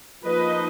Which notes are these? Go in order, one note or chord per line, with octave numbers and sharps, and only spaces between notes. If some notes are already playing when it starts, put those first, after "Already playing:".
F3 A#3 D#4 B4 D#5